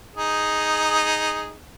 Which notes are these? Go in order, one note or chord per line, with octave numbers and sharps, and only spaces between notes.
D#4 G#4